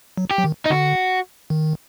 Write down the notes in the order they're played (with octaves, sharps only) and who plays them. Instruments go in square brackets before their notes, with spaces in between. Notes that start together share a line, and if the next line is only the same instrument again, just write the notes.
[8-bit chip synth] F#3
[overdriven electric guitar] G4
[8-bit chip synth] F#3
D#3
[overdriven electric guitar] D#4
[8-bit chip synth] D3 [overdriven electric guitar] F#4
[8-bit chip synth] D#3